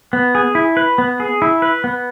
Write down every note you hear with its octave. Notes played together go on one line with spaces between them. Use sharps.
B3
G#4
E4
B4
B3
G#4
E4
B4
B3